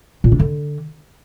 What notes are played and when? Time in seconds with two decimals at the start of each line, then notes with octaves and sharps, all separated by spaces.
0.24 A#2
0.32 D4
0.40 D3